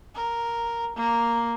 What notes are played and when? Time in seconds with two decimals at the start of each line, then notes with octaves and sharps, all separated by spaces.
0.15 A#4
0.96 A#3